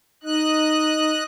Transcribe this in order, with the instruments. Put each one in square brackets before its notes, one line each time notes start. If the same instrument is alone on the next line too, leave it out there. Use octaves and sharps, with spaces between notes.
[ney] D#4 [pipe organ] D#5 F#6